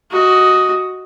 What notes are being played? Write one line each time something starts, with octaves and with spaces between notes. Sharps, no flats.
F#4 D#5